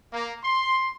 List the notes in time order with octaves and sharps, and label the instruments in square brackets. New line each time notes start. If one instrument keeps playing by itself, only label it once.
[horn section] A#3
C6